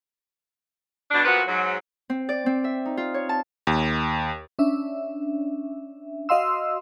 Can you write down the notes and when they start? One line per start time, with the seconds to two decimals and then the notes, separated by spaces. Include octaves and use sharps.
1.11 B2 D4
1.24 A#2 F3 B3 F#4 B4
1.47 G#2 F#3
2.10 C4
2.29 D5
2.46 C4
2.64 E5
2.86 D#4
2.97 F4
3.14 C#5
3.29 A5
3.67 D#2
4.59 C#4 D4 E5
6.29 F#4 D#5 F5 C6 E6